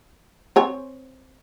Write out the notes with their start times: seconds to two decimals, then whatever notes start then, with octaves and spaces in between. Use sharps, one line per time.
0.56 C4 C#5 G#5